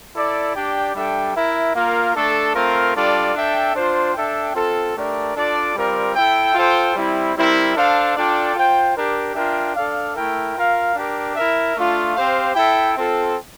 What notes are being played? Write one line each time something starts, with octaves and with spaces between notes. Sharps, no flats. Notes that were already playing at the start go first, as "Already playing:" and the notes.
E4 A4 D5
D4 G4 D5 G5
G3 D4 A4 E5 G5
E4 A#4 E5
A#3 F4 A#4 F5
A3 D4 A4
A3 C4 F4 A#4
G3 D4 F4 A4 D5
D4 A4 E5 G5
D4 F4 C5
D4 A4 E5 G5
C4 F4 A4
A3 D4 G4 A#4 D5
D4 F4 A4 D5
G3 C4 F4 A#4 D5
E4 A4 E5 G5
F4 A4 C5 G5
G3 C4 E4
G3 C4 E4 A#4
D4 A4 C5 F5
D4 F4 A4 D5 G5
F4 C5 G5
D4 G4 A#4
D4 F4 A#4 E5 G5
D4 A4 D5 F5
A3 E4 A#4 E5 G5
F4 A#4 F5
D4 G4 A#4
E4 A#4 E5
A3 D4 F4
C4 G4 C5 F5
E4 A4 E5 G5
C4 F4 A4